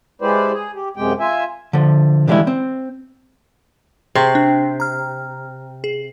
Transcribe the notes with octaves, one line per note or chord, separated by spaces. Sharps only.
G#3 E4 G4 B4 C5 D5
G#4
G4
F#2 C3 G#3 G4 G5
F4 E5 G#5
D3 F3
D3 E3 F3 G3 G#3 E4
C4
C3 G#4 C6 C#6
D4
A#5 F6
G#4